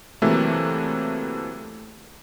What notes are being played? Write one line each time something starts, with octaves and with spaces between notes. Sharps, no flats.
C3 E3 F#3 A3 A#3